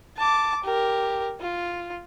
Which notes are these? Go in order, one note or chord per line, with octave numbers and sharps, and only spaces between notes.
A5 D6
G4 A#4
F4